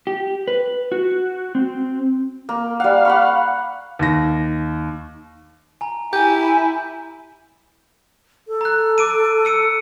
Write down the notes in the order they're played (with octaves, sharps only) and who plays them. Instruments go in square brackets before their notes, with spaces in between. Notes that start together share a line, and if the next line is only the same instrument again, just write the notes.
[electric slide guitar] G4
B4
F#4
C4
[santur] A#3
[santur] G3 F#5 [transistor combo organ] F5
[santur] F#5 B5 C#6
[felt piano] D#2 A#6
[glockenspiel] G#5 A#5
[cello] E4 [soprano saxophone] G4 [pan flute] G#5 [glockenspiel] G6
[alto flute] A4
[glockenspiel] A#5 F#6
D6 D7 D#7
E6 C#7 D#7